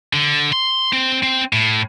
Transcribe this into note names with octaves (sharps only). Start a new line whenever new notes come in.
D3
C6
C4
C4
A2